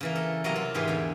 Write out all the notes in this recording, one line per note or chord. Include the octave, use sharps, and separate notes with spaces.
C#3 E3 A#3
A4 A#4
C3 F#3 G3 A#3 A#4 D#5
C4 F4
G#2 E3 G4 G#4 F5
E2 D3